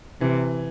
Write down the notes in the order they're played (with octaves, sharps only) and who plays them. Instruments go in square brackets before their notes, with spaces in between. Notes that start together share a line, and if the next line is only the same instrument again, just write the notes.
[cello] C3 [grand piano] E3